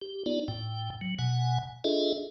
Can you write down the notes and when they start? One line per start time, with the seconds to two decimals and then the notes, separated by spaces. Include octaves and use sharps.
0.02 G4
0.26 B3 D#4 F4 D5
0.48 A2 G5
1.01 F#3
1.19 B2 F#5 G#5
1.84 D4 F4 G#4 A4 D#5 E5